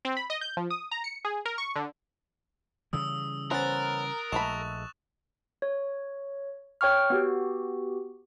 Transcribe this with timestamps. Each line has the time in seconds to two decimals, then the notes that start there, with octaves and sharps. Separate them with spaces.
0.05 C4
0.17 B5
0.30 D#5
0.41 G6
0.57 F3
0.70 D#6
0.91 A#5
1.04 C#7
1.25 G#4
1.45 A#4
1.58 C#6
1.76 D3
2.93 C#3 E3 G3 D#6 E6
3.51 B3 C#4 A#4 C5 F#6 A6
4.32 A#1 G#3 A3 B5 C#6 E7 F7
5.62 C#5
6.81 C#5 G5 C#6 F6
7.10 B3 F#4 G4